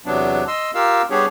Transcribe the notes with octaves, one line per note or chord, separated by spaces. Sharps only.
E2 C3 F#3 B3 D4
D#5 C6 E6
F4 G4 A#4 F5 E6
G3 B3 D4 G4 G#4 C#5